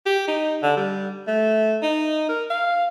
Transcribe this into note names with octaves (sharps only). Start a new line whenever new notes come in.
G4
D#4
D3
G3
A3
D#4
A#4
F5